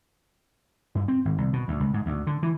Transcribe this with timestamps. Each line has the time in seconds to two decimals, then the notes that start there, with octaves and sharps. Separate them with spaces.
0.95 G2
1.08 C4
1.25 G#1
1.38 C2
1.53 B2
1.68 D2
1.80 C#2
1.94 G#2
2.06 D2
2.27 D3
2.43 E3